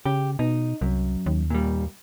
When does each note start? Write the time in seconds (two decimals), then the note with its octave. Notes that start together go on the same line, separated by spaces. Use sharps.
0.06 C#3 G4
0.39 B2 D#4
0.81 C2 F#2
1.26 D#2
1.50 A#2 G3